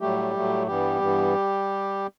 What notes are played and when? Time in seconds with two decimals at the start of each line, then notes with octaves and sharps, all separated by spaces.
0.01 A2 F#3 G3 A3 G4
0.34 A2 F#3 A3
0.67 G2 E3 G3 B3 G4
1.01 G2 E3 B3